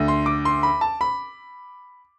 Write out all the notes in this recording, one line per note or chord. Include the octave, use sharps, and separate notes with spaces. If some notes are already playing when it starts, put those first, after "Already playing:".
Already playing: D2 D3
C6
D6
C6
B5
A5
B5